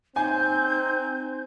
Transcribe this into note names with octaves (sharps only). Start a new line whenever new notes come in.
C4 D#4 G#5 G6